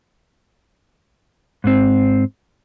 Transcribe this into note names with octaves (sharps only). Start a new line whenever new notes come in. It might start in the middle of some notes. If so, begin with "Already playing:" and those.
G#2 C4